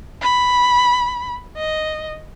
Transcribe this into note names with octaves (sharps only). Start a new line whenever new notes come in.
B5
D#5